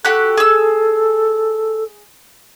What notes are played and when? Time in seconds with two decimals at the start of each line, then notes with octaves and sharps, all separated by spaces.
0.05 F#4 G4 A4 F#6
0.37 G#4 E6